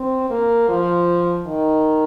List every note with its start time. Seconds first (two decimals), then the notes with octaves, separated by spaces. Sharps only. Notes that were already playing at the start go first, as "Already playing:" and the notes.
Already playing: C4
0.30 A#3
0.69 F3
1.47 D#3